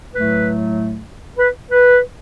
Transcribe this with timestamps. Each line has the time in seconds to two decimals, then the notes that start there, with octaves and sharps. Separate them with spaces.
0.12 A2 F#3 A3 B4
1.38 B4
1.70 B4